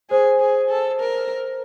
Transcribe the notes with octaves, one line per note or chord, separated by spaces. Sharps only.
G#4 C5
G#4
A4
A#4